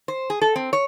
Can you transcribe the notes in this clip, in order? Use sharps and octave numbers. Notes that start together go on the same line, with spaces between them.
C5
G#4
A4
C4
C#5